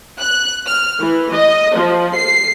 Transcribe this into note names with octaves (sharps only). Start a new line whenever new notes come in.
F#6
F6
E3
D#5
F3
C7